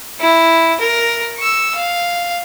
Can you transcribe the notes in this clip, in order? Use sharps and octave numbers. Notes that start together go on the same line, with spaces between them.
E4
A#4
C#6 E6
F5